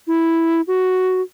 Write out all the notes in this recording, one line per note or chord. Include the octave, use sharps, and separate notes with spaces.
E4
F#4